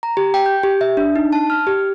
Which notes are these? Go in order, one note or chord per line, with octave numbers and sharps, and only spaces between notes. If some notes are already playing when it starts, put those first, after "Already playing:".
A#5
G4
G5
G6
G4
E5
D4
D#4
A5
F6
G4